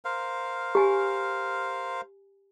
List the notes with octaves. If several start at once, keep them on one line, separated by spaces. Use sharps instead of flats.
A#4 C5 F5
G4 G#5